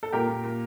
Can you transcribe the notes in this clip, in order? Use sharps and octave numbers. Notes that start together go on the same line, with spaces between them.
A4
A#2 G4 A#4
A#2
A#2